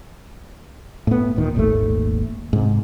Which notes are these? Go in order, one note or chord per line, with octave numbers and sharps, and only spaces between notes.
A2 B3
D1 A#2 D#3
D#1 G#1 D#2 A3
G#2 C3